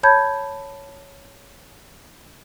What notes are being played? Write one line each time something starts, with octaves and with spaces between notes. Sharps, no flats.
C#5 A5 B5 G6 G#6